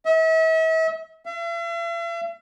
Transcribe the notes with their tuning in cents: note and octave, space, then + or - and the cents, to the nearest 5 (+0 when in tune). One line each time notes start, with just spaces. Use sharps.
E5 -40
E5 +45